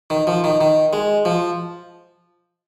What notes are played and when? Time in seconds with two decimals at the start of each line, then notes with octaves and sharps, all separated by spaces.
0.10 D#3
0.27 F3
0.44 D#3
0.61 D#3
0.93 G#3
1.25 F3